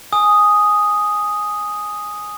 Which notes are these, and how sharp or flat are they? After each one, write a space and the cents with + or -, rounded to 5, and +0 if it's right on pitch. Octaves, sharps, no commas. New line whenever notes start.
G#5 +0 D#6 +0